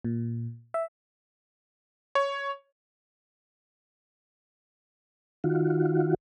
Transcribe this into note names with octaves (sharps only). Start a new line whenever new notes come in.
A#2
E5
C#5
D#3 F4 F#4